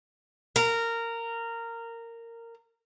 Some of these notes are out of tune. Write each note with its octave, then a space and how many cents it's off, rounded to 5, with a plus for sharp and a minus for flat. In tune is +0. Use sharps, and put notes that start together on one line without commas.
A#4 -15